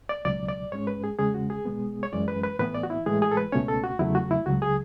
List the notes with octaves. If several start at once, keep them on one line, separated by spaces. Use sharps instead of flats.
D5
C#2 B2 F#3 D5
D5
G#2 G#3 C#4 C#5
B4
G#4
E2 C#3 G#3 C#4 G#4
F#4
G#4
B2 G#3 B3
C#5
F#2 E3 G#3 C#4 D5
B4
B4
A2 E3 B3 B4
D5
F#4
E4
A2 E3 G#3 G#4
G#4
A4
B4
C#2 B2 A3 C#4 C#5
A4
F#4
E2 C#3 F#3 A3 E4
F#4
E4
C#2 C#3 F#3 F#4
G#4